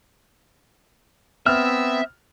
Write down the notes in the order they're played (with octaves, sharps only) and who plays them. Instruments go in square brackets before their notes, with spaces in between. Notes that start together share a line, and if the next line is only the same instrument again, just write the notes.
[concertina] B3 C4 [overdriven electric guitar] E5 [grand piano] F6